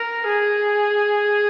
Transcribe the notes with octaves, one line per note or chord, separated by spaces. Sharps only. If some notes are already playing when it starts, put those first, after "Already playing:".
Already playing: A#4
G#4